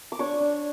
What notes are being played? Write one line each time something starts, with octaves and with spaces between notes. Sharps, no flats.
D6
D4 C#5 C#6
D4